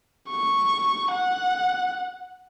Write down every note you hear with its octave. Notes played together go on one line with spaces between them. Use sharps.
C#6
F#5